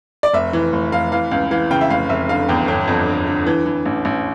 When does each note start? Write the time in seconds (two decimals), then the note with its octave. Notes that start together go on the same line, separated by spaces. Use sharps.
0.23 D5
0.34 F1 E5
0.53 E3
0.73 F1
0.92 F1 F5
1.12 E3 F5
1.31 C#2 F5
1.51 E3 F5
1.71 C#3 G5
1.81 E5
1.90 F1 F5
2.09 F1 E5
2.29 D3 F5
2.49 E2 G5
2.68 G1 G5
2.88 F2
3.07 D3
3.27 D3
3.47 E3
3.66 E3
3.86 A1
4.05 A1